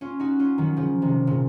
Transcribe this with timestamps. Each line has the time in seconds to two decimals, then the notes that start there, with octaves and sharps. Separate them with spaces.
0.01 C#4 F4
0.20 D#4 F#4
0.39 C#4 F4
0.58 D#3 F#3
0.77 C#3 F3
1.02 C3 D#3
1.27 A#2 C#3